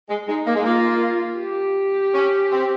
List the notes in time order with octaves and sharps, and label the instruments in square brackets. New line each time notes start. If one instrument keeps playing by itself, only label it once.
[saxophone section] G#3
[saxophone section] G#3 [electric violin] D#4
[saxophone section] A#3
G#3
[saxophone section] A#3 [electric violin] F4
[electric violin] G4
[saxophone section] C#4
C4